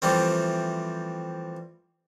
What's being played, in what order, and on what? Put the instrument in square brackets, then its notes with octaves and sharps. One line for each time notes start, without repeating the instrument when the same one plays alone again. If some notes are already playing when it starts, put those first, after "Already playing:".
[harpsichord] E3 F3 G3 A3 C4